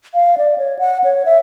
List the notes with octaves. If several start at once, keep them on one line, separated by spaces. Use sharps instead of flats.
F5
D5
C#5
F#5
C#5
E5